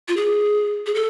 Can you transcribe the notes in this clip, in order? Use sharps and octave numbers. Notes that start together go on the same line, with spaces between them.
F4
G#4
G#4
A4